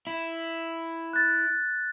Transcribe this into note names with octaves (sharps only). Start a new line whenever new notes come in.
E4
F#6 A6